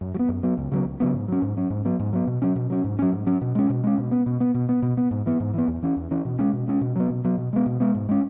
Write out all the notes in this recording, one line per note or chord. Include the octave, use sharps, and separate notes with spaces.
F#2
F#3
B3
F#2
F#3 B3
C#2
C#3 F#3 B3
C#2
C#3 F#3 B3
G#2
F#3 C#4
G#2
F#3 C#4
G#2
F#3 B3
G#2
F#3 B3
B2
F#3 C#4
B2
F#3 C#4
G#2
F#3 C#4
G#2
F#3 C#4
B2
G#3 C#4
B2
G#3 C#4
B2
B3
B2
B3
B2
B3
B2
B3
G#2
E3 B3
G#2
E3 B3
E2
E3 C#4
E2
E3 C#4
B2
G#3 C#4
B2
G#3 C#4
B2
F#3 B3
B2
F#3 B3
B2
G#3 B3
B2
G#3 B3
G#2
G#3 C#4